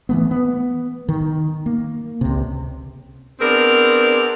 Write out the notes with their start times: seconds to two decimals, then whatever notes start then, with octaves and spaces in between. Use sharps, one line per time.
0.09 E3 A3 B3
0.31 B3
1.09 D#3
1.66 A#3
2.21 C#2 C3
3.40 B3 C4 D4 G#4 A#4